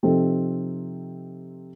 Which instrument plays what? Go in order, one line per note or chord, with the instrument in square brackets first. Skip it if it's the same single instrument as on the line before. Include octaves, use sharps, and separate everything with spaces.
[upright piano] C3 F3 C4 D#4 A4